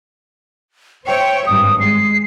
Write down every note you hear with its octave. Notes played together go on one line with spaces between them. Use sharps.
C5 C#5 E5 G5
G#1 G2 D#6
G#3 C7